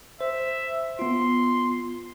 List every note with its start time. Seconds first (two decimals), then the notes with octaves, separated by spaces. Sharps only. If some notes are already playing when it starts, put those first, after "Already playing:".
0.21 C5 E5
0.99 B3 F4 C6